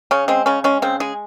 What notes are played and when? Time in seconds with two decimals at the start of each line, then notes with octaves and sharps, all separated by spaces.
0.11 C#3 C#4
0.28 G#3 C4
0.46 C#3 C#4
0.64 G#3 C#4
0.82 C#3 C4
1.00 G#3 G#4